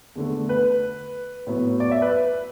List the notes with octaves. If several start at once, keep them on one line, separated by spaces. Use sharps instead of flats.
E2 D3 A3
B4
A2 F#3 B3
D5
E5
B4